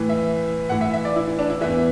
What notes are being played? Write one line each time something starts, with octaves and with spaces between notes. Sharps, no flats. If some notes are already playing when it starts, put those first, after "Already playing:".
Already playing: A2 E3
E5
A2 E3 F#5
E5
E5
D5
E4
E4
D4
E4
E2 E3 E5